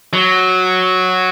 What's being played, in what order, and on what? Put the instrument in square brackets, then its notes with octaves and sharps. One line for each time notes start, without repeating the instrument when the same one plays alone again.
[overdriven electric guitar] F#3